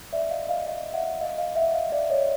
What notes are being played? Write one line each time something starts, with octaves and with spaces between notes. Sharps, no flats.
D5 E5
D#5 F5
D#5 F5
D#5 F5
E5 F#5
D#5 F5
D#5 F5
E5 F#5
D#5 F5
D5 E5
C#5 D#5